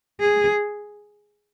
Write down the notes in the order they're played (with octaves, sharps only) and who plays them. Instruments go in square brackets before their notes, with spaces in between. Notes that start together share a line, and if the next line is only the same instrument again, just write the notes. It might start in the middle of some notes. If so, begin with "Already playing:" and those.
[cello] G#4